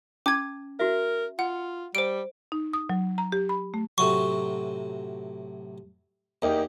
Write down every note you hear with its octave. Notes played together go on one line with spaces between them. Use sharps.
C#4 A5 D6 G#6
F#4 A#4 E5
F4 F#5
G3 C5 D7
D#4
D#6
F#3
A#5
G4
B5
A3
A2 C3 F#3 C#6
E2 A#3 D#4 G4